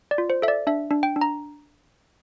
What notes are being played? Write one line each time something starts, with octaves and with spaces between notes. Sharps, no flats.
D5
F4
C5
A4 E5
D5
D4 E5
D4
G5
D4
A#5